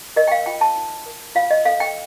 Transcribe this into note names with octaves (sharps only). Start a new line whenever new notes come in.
A#4 D#5
G5
F5
F4 G5
A5
D#4
A#4
F4 F5
D#5
A4 F5
G5